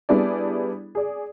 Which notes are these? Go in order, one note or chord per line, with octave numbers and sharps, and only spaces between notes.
G3 B3 D4 E4 G#4 D5
G#4 D5